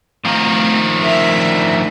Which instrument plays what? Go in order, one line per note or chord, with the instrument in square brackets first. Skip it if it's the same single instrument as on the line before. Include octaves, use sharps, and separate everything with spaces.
[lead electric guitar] D#3 F3 [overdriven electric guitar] A3 F5
[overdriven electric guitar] D2 A#4 [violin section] E5